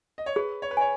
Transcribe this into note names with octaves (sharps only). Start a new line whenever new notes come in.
D#5
C#5
G#4 B4
C#5
B4
C#5 G#5